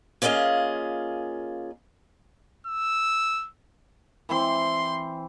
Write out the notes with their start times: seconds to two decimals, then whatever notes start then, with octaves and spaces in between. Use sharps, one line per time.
0.22 A#3 C#4 F4 G#4 D#5 F5
2.67 E6
4.29 E3 C4 C6